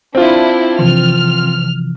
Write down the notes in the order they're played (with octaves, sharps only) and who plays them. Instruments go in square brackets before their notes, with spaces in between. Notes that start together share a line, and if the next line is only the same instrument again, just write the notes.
[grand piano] C4 F4 [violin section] D4 E4
[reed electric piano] C3 E3 F3 [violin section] F6